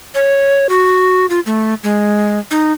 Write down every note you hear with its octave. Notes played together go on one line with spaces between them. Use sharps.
C#5
F#4
F4
A3
G#3
D#4